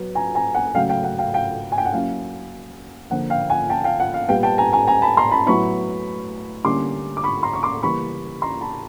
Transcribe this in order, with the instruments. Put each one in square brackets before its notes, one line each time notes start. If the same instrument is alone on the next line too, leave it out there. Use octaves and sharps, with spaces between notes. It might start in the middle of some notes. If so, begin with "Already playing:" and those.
Already playing: [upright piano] F#3 B3
G#5 A#5
G#5 A#5
F#5 G#5
C#3 F#3 A3 F5 G5
F5 G5
F#5
F5 G5
F5 G5
G#5
G5
F#5
F#3 A#3 C#4 E4 F5
D3 F3 A#3 F#5
F5 G5
F#5 G#5
G5 A5
F5 G5
F#5
F5
A#2 G3 B3 F5 G5
G5 A5
G#5 A#5
G#5 A#5
G#5 A#5
A5 B5
A#5 C6
A5 B5
A2 F#3 B3 E4 B5 C#6
D3 G3 A#3 C#4 E4 C6 D6
D6
B5 C#6
A#5 C6
C#6
C6 D6
C#3 E3 G3 A#3 B5 C#6
A#5 C6
A5 B5